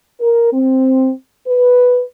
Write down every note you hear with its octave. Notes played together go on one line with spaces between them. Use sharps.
A#4
C4
B4